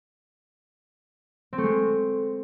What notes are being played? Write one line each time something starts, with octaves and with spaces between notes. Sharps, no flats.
C4
A3
G#3